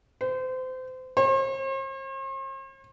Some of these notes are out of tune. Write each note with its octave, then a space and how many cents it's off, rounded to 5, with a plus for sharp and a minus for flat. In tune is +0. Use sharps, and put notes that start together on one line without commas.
C5 -30
C5 +45